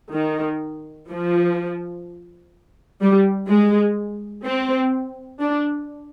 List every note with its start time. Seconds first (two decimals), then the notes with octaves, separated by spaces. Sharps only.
0.13 D#3
1.10 F3
3.01 G3
3.48 G#3
4.45 C4
5.41 D4